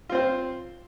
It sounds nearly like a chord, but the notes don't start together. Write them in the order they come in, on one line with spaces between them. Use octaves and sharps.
F4 C4 C5